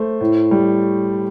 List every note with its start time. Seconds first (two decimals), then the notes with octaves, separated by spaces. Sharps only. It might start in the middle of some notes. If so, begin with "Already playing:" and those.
Already playing: A3 C5
0.21 A2
0.51 G3